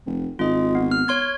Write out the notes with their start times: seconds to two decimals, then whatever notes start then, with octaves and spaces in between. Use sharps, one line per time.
0.06 F1
0.39 G#1 F4 D#5
0.75 B3
0.91 F6
1.08 C#5 C6 G#6